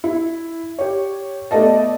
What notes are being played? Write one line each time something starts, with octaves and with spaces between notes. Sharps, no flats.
E4
G4 C#5
A3 B3 D5 D#5 A5